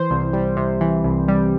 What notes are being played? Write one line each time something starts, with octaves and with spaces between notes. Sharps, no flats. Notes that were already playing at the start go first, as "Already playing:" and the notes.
Already playing: E3 C5
C2
G3
C3
E3
C2
G3